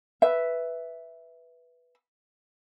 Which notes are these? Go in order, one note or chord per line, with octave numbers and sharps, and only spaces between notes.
B4 E5